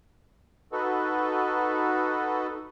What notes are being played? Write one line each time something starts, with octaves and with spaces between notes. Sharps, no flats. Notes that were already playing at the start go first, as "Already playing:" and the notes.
D#4 F#4 A4 B4